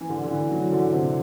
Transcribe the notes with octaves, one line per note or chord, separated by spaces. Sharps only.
E3
D3
D3
E3
F#3
D3
C3